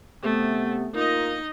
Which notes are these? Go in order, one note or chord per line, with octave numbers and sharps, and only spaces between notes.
C3 A3 B3
A#3 D#4 F4 D#5